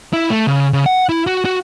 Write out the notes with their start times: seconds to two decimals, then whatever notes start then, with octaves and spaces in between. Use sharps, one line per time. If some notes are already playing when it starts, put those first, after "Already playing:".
0.13 E4
0.30 A3
0.47 C#3
0.73 C#3
0.86 F#5
1.09 E4
1.27 F#4
1.45 F#4